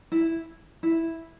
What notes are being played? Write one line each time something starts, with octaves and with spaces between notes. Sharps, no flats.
E4
E4